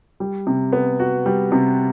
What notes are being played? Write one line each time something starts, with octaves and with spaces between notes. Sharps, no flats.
G3
C3
B3
F#4
G3
C3